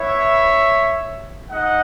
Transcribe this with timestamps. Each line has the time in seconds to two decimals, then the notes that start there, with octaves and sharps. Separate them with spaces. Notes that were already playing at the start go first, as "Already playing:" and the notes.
Already playing: B3 E4 C#5 E5
1.50 G#3 D#4 D#5 F#5